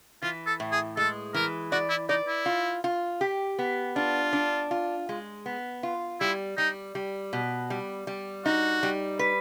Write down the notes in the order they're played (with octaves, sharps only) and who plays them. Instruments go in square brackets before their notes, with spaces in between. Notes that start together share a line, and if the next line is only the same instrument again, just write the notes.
[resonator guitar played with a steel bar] E3 [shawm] F4
[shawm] A4
[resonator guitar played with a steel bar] A2
[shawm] G#4
[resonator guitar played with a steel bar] G#3 [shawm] A4
[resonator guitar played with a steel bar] E3 [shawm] A#4
[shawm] F#4 [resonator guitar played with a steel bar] D5
[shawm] E4
[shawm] D#4 [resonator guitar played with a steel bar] D5
[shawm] E4
[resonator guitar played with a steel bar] F4
F4
G4
B3
[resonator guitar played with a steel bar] D4 [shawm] F4
[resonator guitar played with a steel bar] D4
F4
G#3
B3
F4
[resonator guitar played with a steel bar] G3 [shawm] E4
[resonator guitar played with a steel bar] G3 [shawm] D#4
[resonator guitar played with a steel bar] G3
B2
G3
G3
[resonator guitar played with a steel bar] D#4 [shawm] F#4
[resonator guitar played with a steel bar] G3
B4